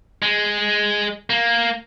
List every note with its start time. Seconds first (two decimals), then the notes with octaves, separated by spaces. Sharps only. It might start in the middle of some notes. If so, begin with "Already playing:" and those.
0.22 G#3
1.30 A#3